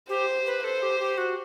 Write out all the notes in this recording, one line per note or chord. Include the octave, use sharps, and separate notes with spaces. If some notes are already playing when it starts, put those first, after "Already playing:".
G4 C5
B4
A4 C5
G4
G4
F#4